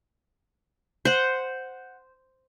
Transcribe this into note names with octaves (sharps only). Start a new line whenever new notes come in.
C5 F#5